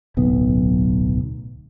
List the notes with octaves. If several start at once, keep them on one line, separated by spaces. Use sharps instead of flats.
D1 B1 B3